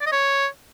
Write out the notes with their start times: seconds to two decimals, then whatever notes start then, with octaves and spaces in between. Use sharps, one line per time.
0.01 D5
0.07 D#5
0.12 C#5